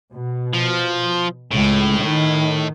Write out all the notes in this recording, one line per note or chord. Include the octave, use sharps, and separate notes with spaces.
B2
F3
C#2 A2
D#3